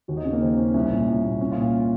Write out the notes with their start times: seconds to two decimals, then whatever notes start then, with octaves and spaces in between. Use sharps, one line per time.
0.08 D#2 F#4
0.17 D#4
0.24 C#3 C#4
0.33 A#3
0.41 D#2 C4
0.57 C#3 C#4
0.74 C2 C#4
0.91 A#2
1.07 C2
1.23 A#2
1.40 C2 C#4
1.52 F4
1.57 A#2
1.62 F4